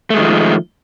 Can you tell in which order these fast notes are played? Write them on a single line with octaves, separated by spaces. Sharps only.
A3 G#3 D#3 F3